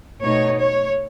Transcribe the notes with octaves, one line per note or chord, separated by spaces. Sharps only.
B2 A3 D#4 C#5
C#5